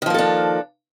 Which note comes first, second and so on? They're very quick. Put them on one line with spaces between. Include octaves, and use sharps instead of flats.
D#3 F3 A#3 A4 D4